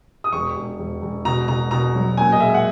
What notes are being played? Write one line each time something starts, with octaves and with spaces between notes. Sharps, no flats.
D#6
E1 C#6
E1
E1
E1
B2 A#5
B2 A#5
B2 A#5
F#3
A#2 G#5
D#5
G#3 E5
F#5